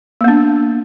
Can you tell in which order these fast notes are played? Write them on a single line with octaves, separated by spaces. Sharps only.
A#3 B3 D4